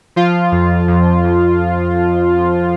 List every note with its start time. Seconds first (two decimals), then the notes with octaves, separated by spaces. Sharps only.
0.16 F3 F4
0.52 F2
0.88 F2
1.24 F2